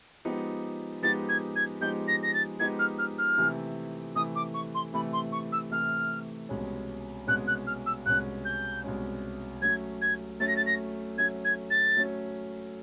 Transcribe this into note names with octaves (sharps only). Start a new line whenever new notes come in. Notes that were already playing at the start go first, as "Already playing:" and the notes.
F3 G#3 B3 D#4 G4
F3 G#3 B3 D#4 G4 A6
G#6
G#6
F3 G#3 B3 D#4 G4 G6
A#6
A#6
A6
F3 G#3 B3 D#4 G4 G#6
F6
F6
F6
C3 E3 A3
C3 E3 A3 D#6
D6
C#6
C6
C3 E3 A3 B5
C6
C#6
E6
C3 E3 A3 F6
C2 B2 G#3 C#4
C2 B2 G#3 C#4 F#6
F#6
F6
E6
C2 B2 G#3 C#4 F#6
G6
C2 B2 G#3 C#4
F#3 A3 C#4 G#6
G#6
F#3 A3 C#4 A6
A#6
A6
A#6
F#3 A3 C#4 G#6
G#6
A6
F#3 A3 C#4